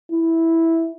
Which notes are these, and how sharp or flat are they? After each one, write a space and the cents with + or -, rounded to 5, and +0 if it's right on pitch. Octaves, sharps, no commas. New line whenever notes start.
E4 -5